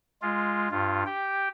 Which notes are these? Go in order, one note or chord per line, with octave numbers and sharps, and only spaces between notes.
G#3 F4
G2 F4
G4 G5